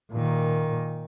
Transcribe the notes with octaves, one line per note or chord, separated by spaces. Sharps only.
A#2 D#3